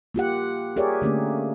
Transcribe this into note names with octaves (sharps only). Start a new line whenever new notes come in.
A#3 F4 G4 F#5
G4 G#4 A#4 C#5 D5 E5
D3 A3 A#3 C#4